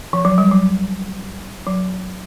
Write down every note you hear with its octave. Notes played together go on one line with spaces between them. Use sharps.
F3
F#3
G3
F#3
F#3